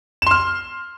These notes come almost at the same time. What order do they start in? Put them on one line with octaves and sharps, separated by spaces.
E7 C6 F6